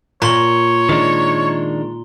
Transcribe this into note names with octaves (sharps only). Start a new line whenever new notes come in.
A#2 C#5 A#5 C6 G7
D#3 G#3 D4